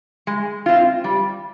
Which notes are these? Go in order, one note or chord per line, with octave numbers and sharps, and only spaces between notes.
G#3
C4 F4
G3